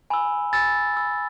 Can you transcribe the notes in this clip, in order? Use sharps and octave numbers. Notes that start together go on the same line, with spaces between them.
G#5 B5 E6
G#5 B5 E6 A6
B5 E6